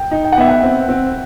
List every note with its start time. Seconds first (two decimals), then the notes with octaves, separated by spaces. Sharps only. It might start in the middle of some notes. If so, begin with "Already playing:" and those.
Already playing: G5
0.11 D#4
0.25 G5
0.32 F#5
0.37 B3 E5
0.49 F#5
0.63 C4
0.89 C4